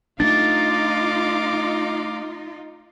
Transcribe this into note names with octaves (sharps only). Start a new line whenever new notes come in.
A3 A#3 D4 D#4 F4 F5 D6 A6